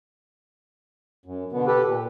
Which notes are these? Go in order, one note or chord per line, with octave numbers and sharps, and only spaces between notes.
F#2
B2 D3 B3
G4 A4 B4
A#2